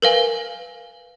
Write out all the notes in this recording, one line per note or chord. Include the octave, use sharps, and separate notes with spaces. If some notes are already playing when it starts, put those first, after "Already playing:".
A#4 B4 F5 G#5